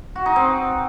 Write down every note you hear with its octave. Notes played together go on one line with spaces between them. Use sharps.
F#4
D#4
C4